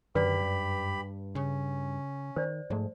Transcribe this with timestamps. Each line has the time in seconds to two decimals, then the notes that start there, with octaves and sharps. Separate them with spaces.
0.15 F#2 D3 D#3 G4 B4 D5 B5
0.41 G2
1.35 C#3 C#4
2.36 D#3 C5 D5
2.70 G#2 F3 G#3 A3